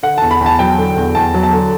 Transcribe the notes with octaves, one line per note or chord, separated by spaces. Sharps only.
D3 F#5
E2 A5
B5
E2
A5
F#3 G5
D3
E2
E2 A5
F#3
A5
D3